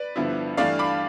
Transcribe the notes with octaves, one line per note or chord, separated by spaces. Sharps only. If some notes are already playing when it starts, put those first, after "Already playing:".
Already playing: B4 D5
G2 D3 F3 B3 E4
G2 E3 A3 D4 D5 F5
B5 D6